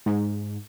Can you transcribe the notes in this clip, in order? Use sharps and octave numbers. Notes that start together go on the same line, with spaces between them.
G#2